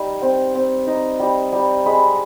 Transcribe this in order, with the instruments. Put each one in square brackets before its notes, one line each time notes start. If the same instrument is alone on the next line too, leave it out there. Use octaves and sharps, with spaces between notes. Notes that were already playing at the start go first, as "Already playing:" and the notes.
Already playing: [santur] G3 D#4
C4
C4
D#4
G3
G3
G#3 B5